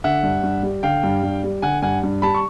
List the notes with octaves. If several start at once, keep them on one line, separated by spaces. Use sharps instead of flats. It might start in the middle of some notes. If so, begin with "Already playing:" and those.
D3 E5 F#5
G2
G2
G3
D3 F5 G5
G2
G2
G3
D3 F#5 G#5
G2 F#5 G#5
G2
G3 A5 B5
C#6